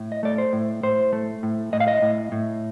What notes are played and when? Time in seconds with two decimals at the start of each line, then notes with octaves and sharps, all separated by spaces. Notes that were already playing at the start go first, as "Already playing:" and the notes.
Already playing: A2
0.12 D#5
0.23 A3 D5
0.38 C5
0.53 A2
0.83 A2 C5
1.13 A3
1.43 A2
1.73 A2 D#5
1.80 F5
1.88 D#5
2.02 A2
2.32 A2